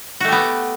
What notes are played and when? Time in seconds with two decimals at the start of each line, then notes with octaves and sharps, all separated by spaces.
0.20 F#4
0.24 A3
0.28 G4
0.32 B3